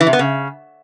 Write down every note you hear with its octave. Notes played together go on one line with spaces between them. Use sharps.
E3
C3
B3
C#3